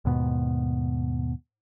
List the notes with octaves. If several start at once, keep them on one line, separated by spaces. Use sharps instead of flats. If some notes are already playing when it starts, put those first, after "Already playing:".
D#2 G#2 B2